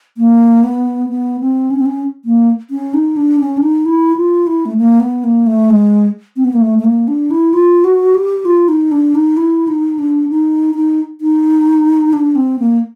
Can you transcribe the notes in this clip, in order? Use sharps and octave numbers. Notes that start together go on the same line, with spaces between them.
A#3
B3
B3
C4
C#4
C4
C#4
A#3
C#4
D#4
D4
C#4
D4
D#4
E4
F4
E4
A3
A#3
B3
A#3
A3
G#3
C4
B3
A#3
A3
A3
A#3
D4
E4
F4
F#4
G4
F4
D#4
D4
D#4
E4
D#4
D4
D#4
D#4
D#4
D4
C4
A#3